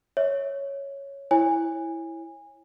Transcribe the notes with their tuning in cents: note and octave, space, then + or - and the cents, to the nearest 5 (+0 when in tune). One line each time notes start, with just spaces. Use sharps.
C#5 +0 E5 -25
E4 +0 C#5 -20 G#5 -20